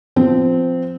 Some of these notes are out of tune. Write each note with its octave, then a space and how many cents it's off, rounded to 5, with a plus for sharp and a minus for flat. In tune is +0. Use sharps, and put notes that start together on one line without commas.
F3 +0 C4 -15